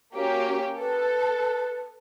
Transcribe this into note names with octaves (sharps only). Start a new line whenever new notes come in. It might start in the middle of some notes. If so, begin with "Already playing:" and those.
A#3 C#4 F#4 G4
A4 B4